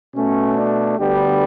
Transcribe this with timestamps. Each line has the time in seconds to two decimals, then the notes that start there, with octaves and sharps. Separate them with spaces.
0.14 B2 A3 C#4
0.57 D4
0.99 D2 D3 G3 B3 G4